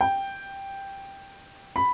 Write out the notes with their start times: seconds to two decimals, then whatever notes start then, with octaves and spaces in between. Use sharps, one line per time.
0.01 G5
1.76 B5